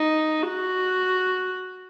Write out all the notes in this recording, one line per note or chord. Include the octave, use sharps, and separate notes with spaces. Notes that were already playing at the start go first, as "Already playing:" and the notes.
Already playing: D#4
F#4